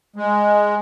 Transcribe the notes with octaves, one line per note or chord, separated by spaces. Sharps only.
G#3